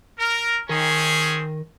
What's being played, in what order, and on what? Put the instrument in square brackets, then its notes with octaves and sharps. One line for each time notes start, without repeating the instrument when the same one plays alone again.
[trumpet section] A#4
[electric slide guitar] D#3 A#4 [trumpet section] C4 C#4 G#4